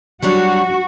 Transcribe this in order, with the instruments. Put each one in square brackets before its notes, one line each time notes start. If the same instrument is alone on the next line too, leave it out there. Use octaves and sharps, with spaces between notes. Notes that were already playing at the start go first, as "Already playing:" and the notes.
[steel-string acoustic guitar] F#3 G3 D4 [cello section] F#4